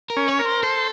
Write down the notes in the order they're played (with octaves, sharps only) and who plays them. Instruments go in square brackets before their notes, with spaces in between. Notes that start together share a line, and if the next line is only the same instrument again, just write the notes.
[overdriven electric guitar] A#4
[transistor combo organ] C#4
[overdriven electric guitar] C#5
[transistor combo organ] A#4
[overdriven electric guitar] C5
[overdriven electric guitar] A4 [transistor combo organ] C5